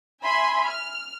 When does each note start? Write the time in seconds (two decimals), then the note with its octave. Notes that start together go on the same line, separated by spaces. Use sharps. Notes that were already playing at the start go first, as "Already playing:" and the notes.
0.24 E5 G#5 B5 C6
0.69 F6